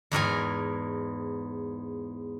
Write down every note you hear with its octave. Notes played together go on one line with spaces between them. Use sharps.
E2 G#2 A#4 G#5